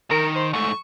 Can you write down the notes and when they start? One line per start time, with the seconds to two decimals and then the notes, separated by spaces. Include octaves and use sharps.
0.11 D#3 A#4
0.35 C5
0.53 G#2 A3 C#6